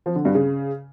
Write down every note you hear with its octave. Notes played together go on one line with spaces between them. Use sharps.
F3
D3
G2
C#3